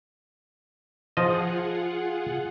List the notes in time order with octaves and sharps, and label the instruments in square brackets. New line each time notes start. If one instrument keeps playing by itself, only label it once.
[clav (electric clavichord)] F3 D#5 [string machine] F4 G#4 F#5